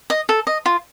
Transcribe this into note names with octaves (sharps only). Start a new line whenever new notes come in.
D#5
A4
D#5
F4